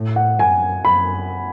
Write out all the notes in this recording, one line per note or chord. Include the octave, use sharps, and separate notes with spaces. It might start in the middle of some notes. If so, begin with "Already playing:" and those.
Already playing: A2
F#5
F#2 G#5
F#2 B5